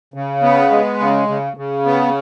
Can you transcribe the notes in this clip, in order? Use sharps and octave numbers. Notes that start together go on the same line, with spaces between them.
C#3
B3
G#3
C#3
C#3
C#3
B3